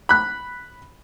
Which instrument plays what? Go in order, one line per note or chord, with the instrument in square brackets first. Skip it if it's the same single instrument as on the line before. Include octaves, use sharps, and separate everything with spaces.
[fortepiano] B5 F#6